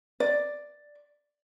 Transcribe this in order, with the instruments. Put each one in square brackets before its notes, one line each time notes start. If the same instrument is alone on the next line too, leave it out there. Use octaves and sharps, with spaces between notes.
[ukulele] D5